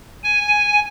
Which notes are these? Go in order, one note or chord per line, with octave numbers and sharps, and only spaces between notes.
G#5